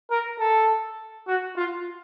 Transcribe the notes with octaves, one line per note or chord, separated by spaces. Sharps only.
A#4
A4
F#4
F4